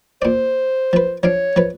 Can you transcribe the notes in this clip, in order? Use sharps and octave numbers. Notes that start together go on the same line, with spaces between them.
A#2 C5 D5
F3 B4
F3 D4 C#5 F5
F3 B4